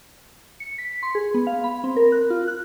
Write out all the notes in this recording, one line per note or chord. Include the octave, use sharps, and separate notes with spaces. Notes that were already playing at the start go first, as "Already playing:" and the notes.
C#7
B6
C6
G#4
B3
F5
B5
C4
A#4
F#6
F4
F#6